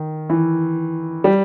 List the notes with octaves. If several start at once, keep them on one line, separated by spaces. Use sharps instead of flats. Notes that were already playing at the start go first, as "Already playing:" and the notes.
Already playing: D#3
E3
G3